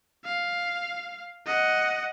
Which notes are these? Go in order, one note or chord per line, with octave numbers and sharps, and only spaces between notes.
F5
D#5 F#5